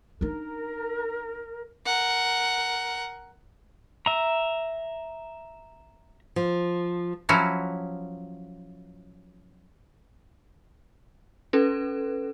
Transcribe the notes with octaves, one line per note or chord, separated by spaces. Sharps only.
D4 D#4 A#4
A#4 F#5
E5 A#5
F3
F3 F#3 C#4 E4 F#4
C#4 A4 B4